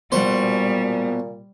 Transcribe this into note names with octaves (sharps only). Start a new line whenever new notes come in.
A#2 G3 B3 F#4 C5 F#5 C#6